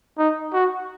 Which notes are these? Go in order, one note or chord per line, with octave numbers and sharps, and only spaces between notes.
D#4
F#4